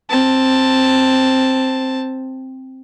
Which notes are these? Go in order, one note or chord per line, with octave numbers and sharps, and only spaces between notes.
C4 A5